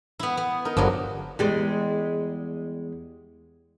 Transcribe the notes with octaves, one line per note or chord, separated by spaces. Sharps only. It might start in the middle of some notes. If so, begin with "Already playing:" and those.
B3 E4
B3
D#4 A#4
G1 G2 D3 F3 F#3
E2 G3 G#3